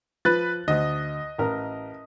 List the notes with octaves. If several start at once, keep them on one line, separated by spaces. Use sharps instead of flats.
F3 B4 F#6 A6
D2 D#5 D#6
A1 A#4